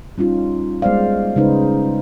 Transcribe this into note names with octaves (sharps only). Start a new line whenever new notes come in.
G3 C#4 D#4 F4
G3 G#3 B3 C5 D5 F5
C#3 G#3 C#4 D#4 B4 C5